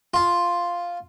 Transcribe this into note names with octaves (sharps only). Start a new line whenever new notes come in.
F4